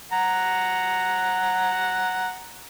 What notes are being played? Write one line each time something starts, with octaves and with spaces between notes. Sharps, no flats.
F#5 A#5